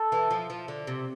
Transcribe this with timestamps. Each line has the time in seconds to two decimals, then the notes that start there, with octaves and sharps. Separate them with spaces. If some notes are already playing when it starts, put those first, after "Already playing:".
Already playing: A4
0.12 E3
0.31 F3
0.50 F3
0.68 D3
0.87 C3